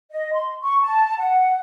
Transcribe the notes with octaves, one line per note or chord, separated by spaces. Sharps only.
D#5
C6
C#6
A5
F#5